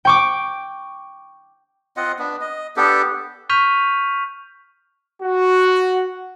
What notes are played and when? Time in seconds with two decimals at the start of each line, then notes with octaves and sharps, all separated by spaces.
0.05 G5 C#6 D6
1.97 C4 F4 D#5 F#5
2.19 B3 D4
2.41 D#5
2.76 B3 D4 G4 A4
3.50 C#6 F6 G6 B6 D#7 F7
5.23 F#4